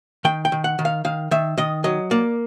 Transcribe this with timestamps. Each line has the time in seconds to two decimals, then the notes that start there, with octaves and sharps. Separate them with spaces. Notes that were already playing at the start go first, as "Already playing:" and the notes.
0.25 D#3 G5
0.45 G5
0.52 D#3
0.64 F#5
0.79 D#3
0.85 F5
1.05 D#3 F5
1.31 D#3 E5
1.58 D#3 D#5
1.84 F#3 D#5
2.11 A#3 D5